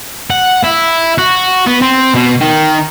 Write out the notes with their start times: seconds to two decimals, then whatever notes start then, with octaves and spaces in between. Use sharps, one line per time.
0.30 F#5
0.64 E4
1.18 F#4
1.67 B3
1.82 C4
2.14 B2
2.40 D#3